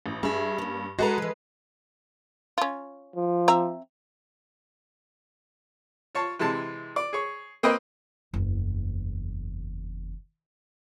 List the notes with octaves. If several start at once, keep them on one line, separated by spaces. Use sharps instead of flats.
A1
G2 G#4 E5
A#3 C#4
G#3 F#4 A4 B4 A#5
E3 F3
C#4 F4
F3
C4 E5 A#5
F4 C#5 A5
C3 E3 G#3 A5
D5
G#4 C#5
A#3 C4 B4 D#5 G5
F#1 E2